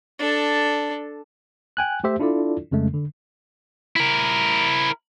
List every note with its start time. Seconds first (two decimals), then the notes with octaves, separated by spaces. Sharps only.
0.19 D4 A4
1.77 G5 G#5 F#6
2.04 A3 G4 C5 E5
2.20 D4 E4 F4 A4 D5
2.71 F2 C#3 G#3 A3
2.94 D3
3.96 E4 A#4